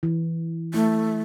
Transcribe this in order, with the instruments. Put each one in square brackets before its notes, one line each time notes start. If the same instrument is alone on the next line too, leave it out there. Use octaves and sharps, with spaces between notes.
[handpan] E3
[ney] A3 [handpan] E4